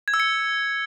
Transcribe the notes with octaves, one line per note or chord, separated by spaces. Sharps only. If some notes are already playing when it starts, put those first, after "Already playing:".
G#6
E6
C#7